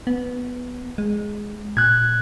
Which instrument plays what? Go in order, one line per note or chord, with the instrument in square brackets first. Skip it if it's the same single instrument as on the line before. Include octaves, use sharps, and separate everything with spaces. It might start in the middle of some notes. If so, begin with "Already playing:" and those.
[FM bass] B3
G#3
[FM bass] A#2 [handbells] F#6 G#6